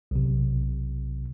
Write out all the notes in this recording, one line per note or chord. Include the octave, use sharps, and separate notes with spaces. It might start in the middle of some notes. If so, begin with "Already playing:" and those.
B1 C3